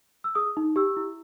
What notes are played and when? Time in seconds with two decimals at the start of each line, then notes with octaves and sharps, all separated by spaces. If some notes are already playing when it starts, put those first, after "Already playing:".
0.24 E6
0.35 G#4 D#6
0.57 D#4
0.76 G4 E6
0.97 E4